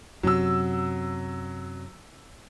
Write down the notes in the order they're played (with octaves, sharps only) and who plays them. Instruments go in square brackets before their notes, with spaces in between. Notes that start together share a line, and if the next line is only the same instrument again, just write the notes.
[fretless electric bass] F#2 C3 [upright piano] F#3 E6